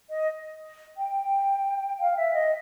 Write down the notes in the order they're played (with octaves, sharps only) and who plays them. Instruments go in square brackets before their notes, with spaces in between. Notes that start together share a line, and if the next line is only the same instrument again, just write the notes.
[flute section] D#5
G5
F5
E5
D#5